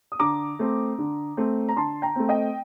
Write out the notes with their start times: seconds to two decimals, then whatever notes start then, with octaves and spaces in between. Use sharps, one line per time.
0.12 D#6
0.19 D3 A#5 D6
0.59 A3 C4
0.98 D3
1.37 A3 C4
1.69 A#5
1.77 D3 A5 C6
2.02 G5 A#5
2.16 A3 C4
2.29 D#5 G5